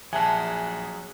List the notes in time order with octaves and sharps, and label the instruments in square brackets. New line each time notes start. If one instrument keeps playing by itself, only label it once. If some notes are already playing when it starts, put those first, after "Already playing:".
[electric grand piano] A#1 G#5 [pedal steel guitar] F#3 G#4 F#5 [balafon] E5 A5